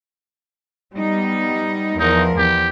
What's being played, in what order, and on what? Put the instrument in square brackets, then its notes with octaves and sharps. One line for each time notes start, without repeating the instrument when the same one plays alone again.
[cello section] G3 B3 D#4
[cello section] E2 F3 A#4 [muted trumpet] D#4
[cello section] E2 [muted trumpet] G4